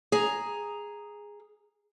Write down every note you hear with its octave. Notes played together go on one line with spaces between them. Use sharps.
G#4 A#5